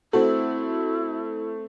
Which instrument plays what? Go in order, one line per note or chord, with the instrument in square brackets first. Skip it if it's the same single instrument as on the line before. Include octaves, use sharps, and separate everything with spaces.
[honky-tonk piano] A3 C4 [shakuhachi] E4 [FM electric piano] F#4 A4